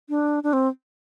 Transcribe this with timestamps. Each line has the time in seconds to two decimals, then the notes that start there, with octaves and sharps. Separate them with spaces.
0.09 D4
0.43 D4
0.53 C4